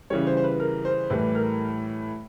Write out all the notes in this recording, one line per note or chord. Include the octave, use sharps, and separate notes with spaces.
C#3 E3 G3 C#5
C5
C5
B4
A#4
C5
A2 E3 G3 B4
A#4